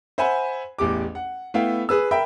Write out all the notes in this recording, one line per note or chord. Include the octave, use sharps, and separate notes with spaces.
C5 E5 F#5 G#5 B5
A1 E2 G4 D6
F#5
A3 B3 E4 F5 G5
G#4 B4 E6
A#4 E5 G5 B5